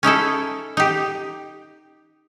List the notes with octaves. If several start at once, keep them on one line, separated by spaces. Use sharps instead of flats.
C#4 D#4 E4 A4
D#4 G4